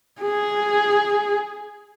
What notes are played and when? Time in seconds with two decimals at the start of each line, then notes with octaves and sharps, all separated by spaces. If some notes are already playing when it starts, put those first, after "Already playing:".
0.21 G#4